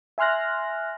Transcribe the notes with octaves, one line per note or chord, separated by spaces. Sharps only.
E5 G#5 C6 F6 F#6 A#6